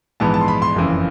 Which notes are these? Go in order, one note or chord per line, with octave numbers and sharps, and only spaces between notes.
A#1 G#2 E3 G#3 B3 A5
A5
C6
B5
C6
F#1 F2 C#3 E3